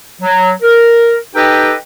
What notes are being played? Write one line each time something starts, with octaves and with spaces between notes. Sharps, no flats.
F#3
A#4
D#4 G4 A4 B4 D#5 G5